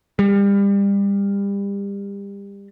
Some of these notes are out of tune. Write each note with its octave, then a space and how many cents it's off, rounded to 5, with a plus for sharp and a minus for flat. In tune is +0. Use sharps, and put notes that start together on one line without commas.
G3 +30